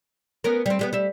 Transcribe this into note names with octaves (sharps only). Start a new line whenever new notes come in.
B3 C#4 A#4
G3 C4
G3 G#3 B3
G3 E5